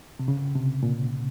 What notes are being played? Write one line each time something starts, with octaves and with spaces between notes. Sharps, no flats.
C3
C#3
C3
A#2